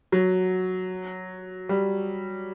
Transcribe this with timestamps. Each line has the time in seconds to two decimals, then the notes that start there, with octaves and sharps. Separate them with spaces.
0.12 F#3
1.69 G3